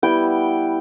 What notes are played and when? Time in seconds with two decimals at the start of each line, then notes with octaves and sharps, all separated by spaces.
0.02 G3 B3 E4 G5